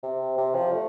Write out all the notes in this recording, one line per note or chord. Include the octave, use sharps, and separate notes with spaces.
C3
C3
F3
A3